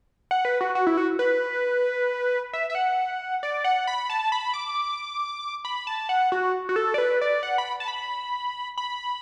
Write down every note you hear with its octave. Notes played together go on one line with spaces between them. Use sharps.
F#5
B4
F#4
F#4
E4
F#4
B4
E5
E5
F#5
D5
F#5
B5
A5
B5
D6
B5
A5
F#5
F#4
F#4
A4
D5
B4
D5
F#5
B5
A5
B5
B5